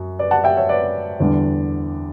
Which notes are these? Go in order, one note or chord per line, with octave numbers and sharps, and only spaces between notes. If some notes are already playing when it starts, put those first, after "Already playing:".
Already playing: F#2 F#4
B4 D5
F#5 A5
E5 G5
C#5 E5
B4 D5
E2 D3 G3 D4